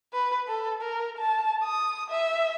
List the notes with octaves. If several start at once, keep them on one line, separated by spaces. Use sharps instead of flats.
B4
A4
A#4
A5
D#6
E5